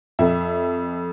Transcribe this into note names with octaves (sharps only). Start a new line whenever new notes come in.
F2 E5